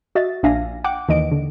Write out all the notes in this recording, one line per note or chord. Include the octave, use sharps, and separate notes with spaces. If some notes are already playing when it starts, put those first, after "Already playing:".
F#4 D#5 E5 A6
A#1 D4 E5 F5 G#5 A#6
F#5 G5 D6
D#2 E3 D#5 D7
D3